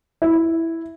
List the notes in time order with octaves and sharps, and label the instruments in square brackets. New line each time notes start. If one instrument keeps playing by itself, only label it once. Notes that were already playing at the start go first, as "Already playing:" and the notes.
[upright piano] E4